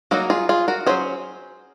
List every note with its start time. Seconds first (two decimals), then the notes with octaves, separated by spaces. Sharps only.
0.11 F#3 A#3 D#4 F#4 A#4
0.30 F4 G#4
0.49 F4 G#4
0.68 F#4 A#4
0.86 F#3 C#4 G#4 C5